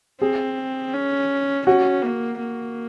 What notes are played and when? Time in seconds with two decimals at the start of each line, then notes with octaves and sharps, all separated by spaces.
0.21 C4 G#4
0.94 C#4
1.66 C#4 F#4
2.02 A#3
2.39 A#3